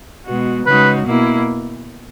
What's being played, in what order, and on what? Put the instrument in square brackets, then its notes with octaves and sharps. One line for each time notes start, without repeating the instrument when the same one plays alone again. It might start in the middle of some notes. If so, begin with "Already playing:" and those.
[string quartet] B2 G#3 B3 F#4
[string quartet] C#3 G#3 D#4 F#4 [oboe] B4
[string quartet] B2 A#3 E4